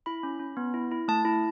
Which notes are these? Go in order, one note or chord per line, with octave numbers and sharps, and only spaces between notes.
E4 B5
C#4
C#4
B3
E4
E4
A3 A5
E4